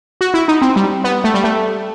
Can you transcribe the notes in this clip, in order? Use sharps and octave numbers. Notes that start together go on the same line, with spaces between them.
F#4
E4
D#4
C4
G3
B3
A3
G3
A3